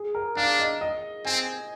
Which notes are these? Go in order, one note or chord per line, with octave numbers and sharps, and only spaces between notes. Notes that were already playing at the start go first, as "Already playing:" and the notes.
Already playing: G#4
A#4
D4 F5
D#5
D#5
C4 G#5